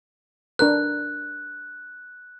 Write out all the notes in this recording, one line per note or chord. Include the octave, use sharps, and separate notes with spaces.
D4 A#4 B4 F#6